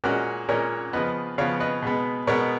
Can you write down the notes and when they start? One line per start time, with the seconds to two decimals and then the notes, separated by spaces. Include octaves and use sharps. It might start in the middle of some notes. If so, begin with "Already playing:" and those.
0.04 A#2 G#3 C#4 F#4 A#4
0.49 A#2 G#3 C#4 A#4 C#5
0.93 C#3 F3 B3 B4 D#5
1.38 C#3 F3 B3 C#5 F5
1.60 B4 D#5
1.82 B2 G#3 B3
2.27 B2 G#3 B3 A#4 C#5